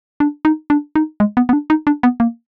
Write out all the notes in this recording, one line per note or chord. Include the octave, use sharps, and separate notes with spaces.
D4
D#4
D4
D#4
G#3
B3
B3
D4
D#4
D4
B3
A#3